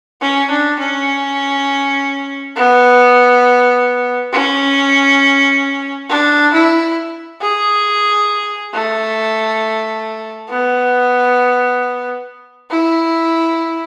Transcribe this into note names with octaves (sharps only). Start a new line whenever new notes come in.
C#4
D4
C#4
B3
C#4
D4
E4
G#4
A3
B3
E4